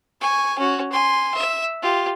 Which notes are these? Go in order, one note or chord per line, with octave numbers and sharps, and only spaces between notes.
G#5 C#6
C#4 F#4
G#5 C6
E5
F4 G4